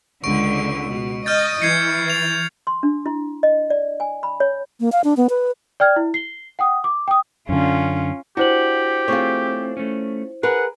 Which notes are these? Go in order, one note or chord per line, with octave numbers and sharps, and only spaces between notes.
C#2 D3 C#6 D7
B2
D#5 F6 G6 A6
E3 G#6 C7 C#7
A6 F7
C6
D4
E4
D#5
D5
G#5
B5
C#5
A#3
F5
D4
B3
B4
D5 G5 F6 G#6
E4
C7 G7
F#5 G5 D#6
D6
G5 D#6
F#2 D3 C#4 F4
D4 E4 F#4 G4 C5 F#7
A3 C4 F4 G#4 C#5
A3 C#4
G#4 A#4 B4 F#5